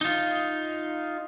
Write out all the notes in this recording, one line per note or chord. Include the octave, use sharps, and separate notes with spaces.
D#4 F4